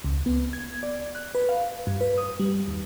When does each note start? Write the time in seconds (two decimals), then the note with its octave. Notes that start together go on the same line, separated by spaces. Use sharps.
0.04 C#2
0.26 B3
0.53 G#6
0.83 D5
1.15 F#6
1.35 B4
1.49 F5
1.87 G2
2.01 B4
2.18 D#6
2.39 G3
2.68 D#2